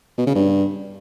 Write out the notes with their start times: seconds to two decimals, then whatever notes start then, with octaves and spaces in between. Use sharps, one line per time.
0.18 B2
0.26 C#3
0.35 G2